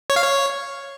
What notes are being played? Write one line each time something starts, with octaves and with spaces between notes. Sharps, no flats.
C#5
F5
C#5